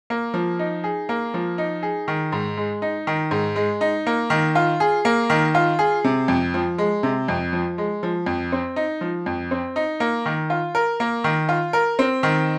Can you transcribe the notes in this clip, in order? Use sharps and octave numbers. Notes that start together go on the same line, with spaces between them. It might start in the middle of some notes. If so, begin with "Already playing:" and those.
A#3
F3
D#4
G#4
A#3
F3
D#4
G#4
D#3
G#2
G#3
D#4
D#3
G#2
G#3
D#4
A#3
D#3
F4
G#4
A#3
D#3
F4
G#4
C3
F2
F3
G#3
C3
F2
F3
G#3
F3
F2
C4
D#4
F3
F2
C4
D#4
A#3
D#3
F4
A#4
A#3
D#3
F4
A#4
C4
D#3